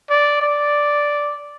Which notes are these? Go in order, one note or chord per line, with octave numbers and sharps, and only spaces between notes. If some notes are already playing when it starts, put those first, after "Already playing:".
D5
D5